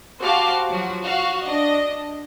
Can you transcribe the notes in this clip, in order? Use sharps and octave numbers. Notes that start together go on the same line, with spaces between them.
F#4 G4 C5 F5 A5 D6
F3 F#3 F#4
F#4 F5
D4 D#5